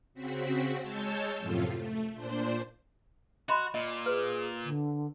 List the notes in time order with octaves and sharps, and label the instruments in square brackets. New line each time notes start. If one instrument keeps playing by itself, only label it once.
[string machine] C#3 C4 F#4 B6
G#3 C#5 A5 E6 G6
F#2 A2 C3 F3 A3 F4
A3
A#2 D4 C5 C6
[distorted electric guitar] F#4 [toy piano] D#5 B5 C6
[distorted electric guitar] A#2 [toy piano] D#5
[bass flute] G#4 [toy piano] B4
[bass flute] D3